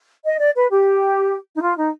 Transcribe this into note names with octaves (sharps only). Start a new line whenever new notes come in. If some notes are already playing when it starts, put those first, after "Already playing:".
D#5
D5
B4
G4
D#4
F4
D#4